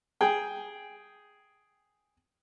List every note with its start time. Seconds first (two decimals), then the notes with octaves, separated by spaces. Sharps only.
0.21 G#4 G5